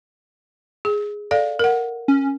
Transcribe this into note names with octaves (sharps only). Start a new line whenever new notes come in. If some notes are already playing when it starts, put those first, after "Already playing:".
G#4
A4 D5 F5
A#4 F#5
C#4